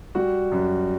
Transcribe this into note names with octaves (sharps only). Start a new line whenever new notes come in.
G3 F#4
F#2